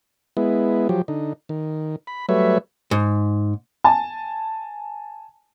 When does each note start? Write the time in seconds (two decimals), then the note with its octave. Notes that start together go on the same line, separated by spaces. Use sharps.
0.37 G#3 B3 E4
0.89 F3 F#3 G4
1.08 D3 D#4
1.49 D#3
2.07 B5
2.29 F#3 G3 A3 B4 C#5 E5
2.91 G#2
3.84 G#5 A5